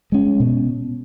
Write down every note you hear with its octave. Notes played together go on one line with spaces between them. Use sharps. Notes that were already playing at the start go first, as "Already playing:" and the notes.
G#3 C#4
B2